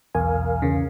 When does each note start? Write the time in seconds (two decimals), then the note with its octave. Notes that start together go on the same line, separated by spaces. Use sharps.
0.15 B1 E2 A#4 F5 G#5
0.62 E2 C#3